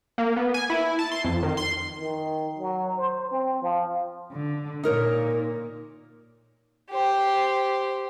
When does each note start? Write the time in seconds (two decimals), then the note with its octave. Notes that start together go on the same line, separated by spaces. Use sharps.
0.18 A#3
0.36 B3
0.54 G#5
0.70 E4
0.99 A5
1.12 C6
1.24 F2
1.43 D#3
1.57 C6
1.99 D#3
2.58 F#3
2.98 C5
3.31 C4
3.62 F3
4.32 D3
4.83 A#2 A#3 D#4 A#4 C#5
6.90 G4 C5